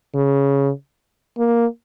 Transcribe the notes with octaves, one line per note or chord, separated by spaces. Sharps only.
C#3
A#3